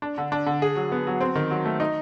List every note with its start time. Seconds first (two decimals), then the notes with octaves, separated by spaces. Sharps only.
0.02 D4
0.18 D3
0.32 D4
0.46 D3
0.62 G#4
0.76 F#3
0.92 B3
1.07 F#3
1.21 C4
1.35 D#3
1.50 F#3
1.65 A3
1.80 D#4